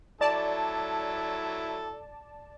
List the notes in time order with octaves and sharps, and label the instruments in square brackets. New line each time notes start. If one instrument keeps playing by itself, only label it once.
[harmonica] F#3 E4 A4 [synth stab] D5 A5